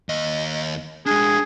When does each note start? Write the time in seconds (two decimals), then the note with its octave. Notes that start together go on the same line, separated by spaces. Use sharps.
0.09 D#2 D#5
1.07 G#3 D4 G#4